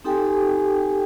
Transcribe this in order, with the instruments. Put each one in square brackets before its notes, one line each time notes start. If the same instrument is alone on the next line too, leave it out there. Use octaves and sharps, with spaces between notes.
[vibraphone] C4 D#4 G4 A4 G5 G#5